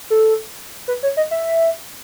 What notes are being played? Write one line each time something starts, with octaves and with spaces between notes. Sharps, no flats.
A4
B4
C#5
D#5
E5